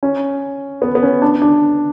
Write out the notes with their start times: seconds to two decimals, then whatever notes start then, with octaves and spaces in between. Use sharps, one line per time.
0.03 C#4
0.82 B3
0.95 B3
1.03 C#4
1.22 D4
1.42 D4